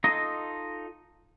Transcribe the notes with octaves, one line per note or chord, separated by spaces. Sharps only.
D#4 F4 A4 D#5 A#5